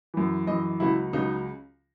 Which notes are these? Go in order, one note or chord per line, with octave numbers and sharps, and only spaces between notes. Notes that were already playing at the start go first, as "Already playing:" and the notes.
F#2 E3
F#2 E3 D#5
C#2 C#3 F#3 E4
C#2 C#3 F#3 D#4